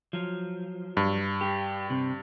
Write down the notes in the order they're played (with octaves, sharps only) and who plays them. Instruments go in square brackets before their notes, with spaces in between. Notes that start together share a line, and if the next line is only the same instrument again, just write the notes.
[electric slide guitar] F3 F#3
[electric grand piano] G2
[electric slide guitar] G4
C3